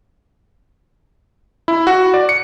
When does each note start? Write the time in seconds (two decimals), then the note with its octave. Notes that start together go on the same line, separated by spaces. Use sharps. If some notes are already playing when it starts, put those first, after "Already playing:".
1.68 E4
1.87 F#4
2.14 D5
2.29 C#7